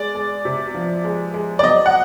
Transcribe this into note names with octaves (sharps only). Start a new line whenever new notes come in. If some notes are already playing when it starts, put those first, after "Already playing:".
Already playing: G#3 D5
G#3
C3
F3
G#3
G#3
D5
F#3 D#5
F#5